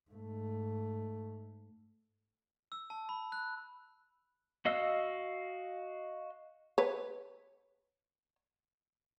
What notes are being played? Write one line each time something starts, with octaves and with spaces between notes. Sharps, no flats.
G#2 A3
E6
A5
B5
F#6
F#4 D#5 F5 E6
B4 C#5